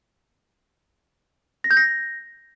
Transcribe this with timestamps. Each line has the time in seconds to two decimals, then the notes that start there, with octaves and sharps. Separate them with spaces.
1.64 A#6
1.71 G6
1.77 A#6